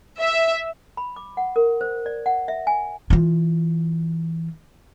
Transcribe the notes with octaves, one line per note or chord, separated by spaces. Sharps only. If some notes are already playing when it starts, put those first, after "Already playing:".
E5
B5
D6
F#5
A#4
C5
D5
F#5
E5
G#5
E3 F4